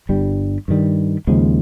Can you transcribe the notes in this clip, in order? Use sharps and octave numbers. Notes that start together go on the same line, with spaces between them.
G1 G2 G3
G2 D#3 G3
D#2 C#3 F3 G#3